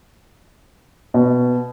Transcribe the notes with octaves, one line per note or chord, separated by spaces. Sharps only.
B2